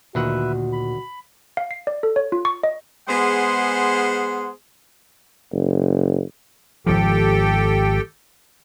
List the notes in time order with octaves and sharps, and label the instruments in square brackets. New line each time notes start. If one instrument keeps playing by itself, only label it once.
[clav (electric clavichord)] D2 D#3 F#5 [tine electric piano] A#2 [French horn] F#4 [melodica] B4 E5
[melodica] B5
[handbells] F5
C7
D5
A4
C#5
F4
C#6
D#5
[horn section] G#3 B3 G#4 C5 F#5 C6
[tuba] F#1
[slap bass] G#1 F3 [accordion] G4 A4 G5